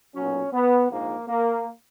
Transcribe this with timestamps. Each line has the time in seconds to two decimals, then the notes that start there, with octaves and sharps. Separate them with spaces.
0.15 B1 A#2 F#3 C#4
0.53 B3
0.90 A#1 G#2 F3 A#3
1.28 A#3